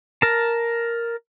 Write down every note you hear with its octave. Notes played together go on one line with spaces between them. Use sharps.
A#4 A5